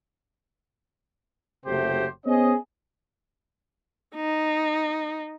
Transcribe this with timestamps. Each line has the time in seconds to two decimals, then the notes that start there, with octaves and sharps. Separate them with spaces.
1.66 F#1 C3 F#3 A3 G4 C5
2.26 B3 C#4 G#4 C5 D#5
4.16 D#4